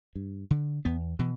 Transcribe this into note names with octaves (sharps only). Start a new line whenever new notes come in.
G2
D3
E2 B3
B2 E3